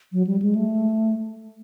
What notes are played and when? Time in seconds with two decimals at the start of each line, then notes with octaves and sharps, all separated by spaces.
0.13 F#3
0.27 G3
0.42 G#3
0.55 A3